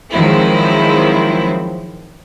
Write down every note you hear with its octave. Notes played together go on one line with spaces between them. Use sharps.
D#3 F3 F#3 G#3 C4 E4